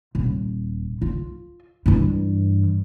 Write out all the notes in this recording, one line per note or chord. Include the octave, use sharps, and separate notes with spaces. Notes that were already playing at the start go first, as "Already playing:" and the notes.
D#1
F4
G2 E3